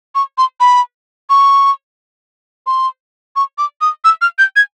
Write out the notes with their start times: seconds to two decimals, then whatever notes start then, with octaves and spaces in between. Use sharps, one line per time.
0.15 C#6
0.38 C6
0.60 B5
1.30 C#6
2.67 C6
3.36 C#6
3.58 D6
3.81 D#6
4.04 E6
4.22 F6
4.38 G6
4.56 G#6